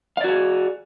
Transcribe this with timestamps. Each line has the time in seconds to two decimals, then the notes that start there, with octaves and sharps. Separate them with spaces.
0.17 F5
0.21 D5
0.24 F#4
0.27 G#4